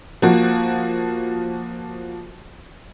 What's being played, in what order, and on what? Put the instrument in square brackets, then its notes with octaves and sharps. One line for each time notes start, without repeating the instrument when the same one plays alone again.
[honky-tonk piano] F3 A#3 F#4